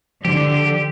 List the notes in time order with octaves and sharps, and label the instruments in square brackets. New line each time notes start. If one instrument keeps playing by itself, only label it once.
[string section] D3 [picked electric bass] F3 [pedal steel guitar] G4